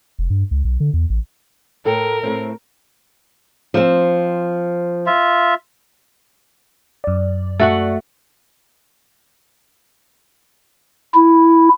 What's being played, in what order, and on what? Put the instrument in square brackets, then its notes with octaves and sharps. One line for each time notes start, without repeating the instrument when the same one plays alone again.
[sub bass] F1
G2
C#2
B1
D3
E2
A1
[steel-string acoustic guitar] A2 A4 G5 [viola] A#4
[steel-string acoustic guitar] A2 A3 C4
[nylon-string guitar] F3 C4
[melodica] F4 E5
[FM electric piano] F#2 D5
[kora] A3 F#4 F#5
[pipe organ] E4